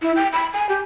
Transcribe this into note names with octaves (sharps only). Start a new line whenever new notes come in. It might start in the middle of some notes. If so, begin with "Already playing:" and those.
E4
G5
B5
G#5
G4